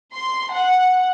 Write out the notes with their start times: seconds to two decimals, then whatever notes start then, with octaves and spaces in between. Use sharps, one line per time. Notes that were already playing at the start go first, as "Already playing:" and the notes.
0.14 C6
0.55 F#5